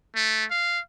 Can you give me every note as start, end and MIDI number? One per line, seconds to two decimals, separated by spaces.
0.15 0.45 57
0.51 0.80 77